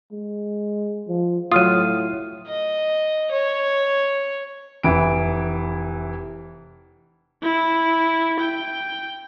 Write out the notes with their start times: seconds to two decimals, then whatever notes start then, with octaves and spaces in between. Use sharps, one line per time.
0.12 G#3
1.08 F3
1.52 A2 F#3 F4 D#6 F6 D#7
2.47 D#5
3.31 C#5
4.83 F1 E3 D7
7.43 E4
8.40 G5